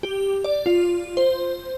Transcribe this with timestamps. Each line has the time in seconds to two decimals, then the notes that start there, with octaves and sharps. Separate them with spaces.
0.03 G4
0.44 D5
0.66 F4
1.17 C5